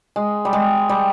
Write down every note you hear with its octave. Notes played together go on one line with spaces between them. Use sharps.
G#3
G3
G#3
G3